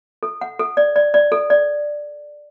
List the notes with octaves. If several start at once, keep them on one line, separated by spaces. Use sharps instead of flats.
A4
F#5
A4
D5
D5
D5
A4
D5